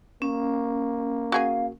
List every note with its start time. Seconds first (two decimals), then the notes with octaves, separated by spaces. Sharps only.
0.22 A#3 C#4
1.32 F#4 G#4 F5 G#5